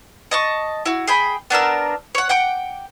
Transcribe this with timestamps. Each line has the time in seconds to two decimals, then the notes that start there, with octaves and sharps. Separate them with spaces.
0.31 D#5 A5 C#6
0.86 E4 F#4
1.07 G#4 G5 B5
1.50 B3 D4 A#4 E6
2.15 C#5 F#5
2.29 F#5 G5 D6